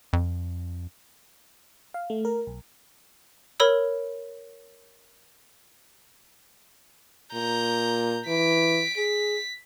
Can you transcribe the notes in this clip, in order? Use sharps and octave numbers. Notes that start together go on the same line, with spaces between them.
F2
F5
A3
A#4
B1
A#4 C#5 B5 E6
A#2 A#5 G6
E3 B6 D7
G#4 B6